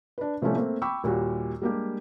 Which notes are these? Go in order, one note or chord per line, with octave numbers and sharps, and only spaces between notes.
D4 B4
A2 C3 F3 G3 A3 C#4
A3 A#3 C4
G5 B5 C#6 D6 E6
D#2 A#2 G3 F#4
G3 G#3 A#3 D4 G4